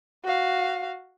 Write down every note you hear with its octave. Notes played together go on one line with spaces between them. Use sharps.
F#4 F5